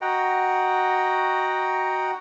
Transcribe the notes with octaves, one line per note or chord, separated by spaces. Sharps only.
F#4 D#5 F#5 G5 A#5